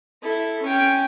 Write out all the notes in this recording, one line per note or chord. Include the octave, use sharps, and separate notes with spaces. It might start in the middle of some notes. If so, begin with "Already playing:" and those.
E4 A4
C#4 G5